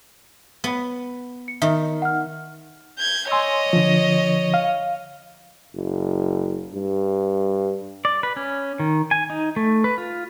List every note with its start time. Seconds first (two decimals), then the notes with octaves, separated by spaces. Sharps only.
0.64 B3
1.48 C#7
1.62 D#3 D#5 E5
2.02 F#5 F6
2.99 G6 G#6
3.31 C#5 D#5 G#5 C6 E6
3.73 D3 F3
4.54 F5
5.75 F#1
6.73 G2
8.05 D5
8.23 B4
8.36 C#4
8.80 D#3
9.11 G#5
9.30 D#4
9.56 A3
9.84 B4
9.98 F4